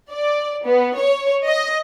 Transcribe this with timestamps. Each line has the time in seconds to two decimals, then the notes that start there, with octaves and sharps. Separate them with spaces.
0.11 D5
0.65 B3
0.96 C#5
1.47 D#5